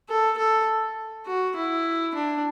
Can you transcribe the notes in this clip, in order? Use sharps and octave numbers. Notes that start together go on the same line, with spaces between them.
A4
A4
F#4
E4
D4